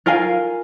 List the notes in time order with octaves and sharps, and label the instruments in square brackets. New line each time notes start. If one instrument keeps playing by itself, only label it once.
[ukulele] F4 A#4 F5 G#5